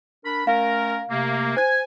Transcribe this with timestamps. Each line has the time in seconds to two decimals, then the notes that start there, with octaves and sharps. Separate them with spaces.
0.25 D4 A#4 B5
0.47 A3 C#4 A#4 F5
1.10 C3 A3 A#3
1.57 C5 G#5 G#6